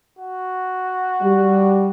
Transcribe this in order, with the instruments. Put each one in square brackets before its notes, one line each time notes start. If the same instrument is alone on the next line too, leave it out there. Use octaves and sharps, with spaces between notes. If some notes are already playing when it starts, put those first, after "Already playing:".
[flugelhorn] F#4
[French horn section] G3